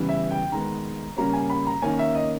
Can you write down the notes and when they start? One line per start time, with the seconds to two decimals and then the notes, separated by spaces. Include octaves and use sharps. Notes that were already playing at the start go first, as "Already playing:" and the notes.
Already playing: C#3 E3 G3 B3
0.09 E5
0.31 G5
0.52 D#3 G#3 B3 A#5
1.17 C#3 G3 A#3 C#4 A#5
1.33 G#5
1.50 B5
1.67 A#5
1.82 D#3 A#3 C#4 G#5
1.99 E5
2.15 D#5